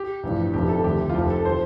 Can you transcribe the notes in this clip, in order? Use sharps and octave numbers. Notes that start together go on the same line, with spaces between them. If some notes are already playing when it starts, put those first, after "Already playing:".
Already playing: G4
A1 G2 F3
F1 F2 C3 F3 G4
A4
D2 C3 F3 G4
F4
F1 F2 F3 G4
A4
F3 C5